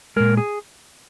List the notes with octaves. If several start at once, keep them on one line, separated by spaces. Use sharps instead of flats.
A#2 G#3 A#4
G#4